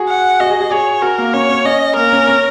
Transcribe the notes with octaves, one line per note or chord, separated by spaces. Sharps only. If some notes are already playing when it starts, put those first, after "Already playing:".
Already playing: F#4 G#4
F#5
F#4 D#5
G#4
G#4
G#4 C#5
F#4 A#4
A#3
C#4 C#5
C#4
C#4 D#5
A#3 A#4
C#4
C#4